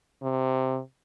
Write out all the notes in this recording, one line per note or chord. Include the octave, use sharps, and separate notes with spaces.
C3